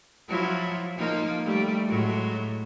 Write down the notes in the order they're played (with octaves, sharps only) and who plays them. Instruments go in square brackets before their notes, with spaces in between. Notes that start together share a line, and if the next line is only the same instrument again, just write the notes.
[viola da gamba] F3 F#3 E4
F3 A#3 D#4
G3 A3
A2 F#3 G#3